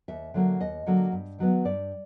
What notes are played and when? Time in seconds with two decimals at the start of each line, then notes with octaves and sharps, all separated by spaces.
0.08 D#2 E5
0.34 D3 F#3 A#3
0.61 D#2 D#5
0.86 D3 F#3 A#3
1.12 G2
1.39 D#3 F#3 B3
1.65 G2 D5